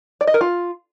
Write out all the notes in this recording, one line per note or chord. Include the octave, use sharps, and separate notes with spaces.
D5
D#5
A#4
F4